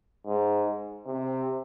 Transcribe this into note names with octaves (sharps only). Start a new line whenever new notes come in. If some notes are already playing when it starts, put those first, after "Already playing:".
G#2
C3